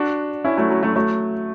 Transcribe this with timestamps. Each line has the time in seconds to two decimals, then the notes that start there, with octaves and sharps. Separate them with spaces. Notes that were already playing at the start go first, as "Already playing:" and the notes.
Already playing: D4 F#4
0.44 C#4 E4
0.57 F#3 A3
0.70 F#3
0.83 F#3 A3
0.96 F#3 A3